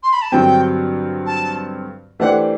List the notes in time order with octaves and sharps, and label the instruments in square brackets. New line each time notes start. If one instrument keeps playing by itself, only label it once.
[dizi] C6
B5
A5
[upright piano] G2 D3 F#3 C4 G4 [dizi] G5
[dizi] A5
[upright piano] E3 A3 D4 G4 C5 [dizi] F#5